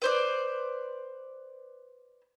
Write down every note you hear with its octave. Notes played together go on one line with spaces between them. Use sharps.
B4 C5 D5